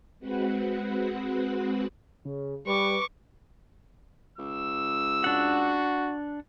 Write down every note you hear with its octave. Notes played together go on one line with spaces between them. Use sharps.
G#3 C4 F#4 B4 F#5
C#3
G3 B4 C#6 D6
C#2 E6
D4 F#4 F#5